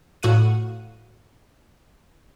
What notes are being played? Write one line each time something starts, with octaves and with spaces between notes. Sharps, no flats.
A2 F#4 F5 F#5 D#7